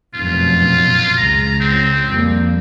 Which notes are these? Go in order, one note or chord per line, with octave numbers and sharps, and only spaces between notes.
F1 F#2 B2 F4
C#2 A#5
C4
F2 G3 A#3